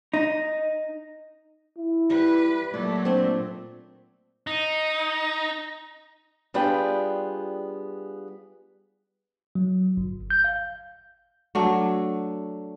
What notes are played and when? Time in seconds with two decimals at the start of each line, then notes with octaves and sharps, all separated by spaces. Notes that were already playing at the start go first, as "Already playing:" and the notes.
0.14 D#4
1.77 E4
2.10 G3 B4
2.74 A#2 F#3 A3 D5
3.05 C4 D4 C6
4.47 D#4
6.54 G3 B3 D4 F4 G#4 G5
9.55 F#3
9.97 G1
10.30 G6
10.44 F5
11.55 F#3 A3 D4